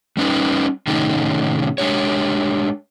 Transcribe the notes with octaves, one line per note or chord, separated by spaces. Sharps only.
G3 C#4 D#4 B4
A2 C3 D#3 C#4 D#4 G#4
G#3 D4 G4 C#5